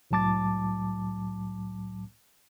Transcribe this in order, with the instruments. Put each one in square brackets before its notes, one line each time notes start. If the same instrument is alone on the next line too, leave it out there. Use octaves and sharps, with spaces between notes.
[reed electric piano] C2 A2 F#3 A5 D6 A6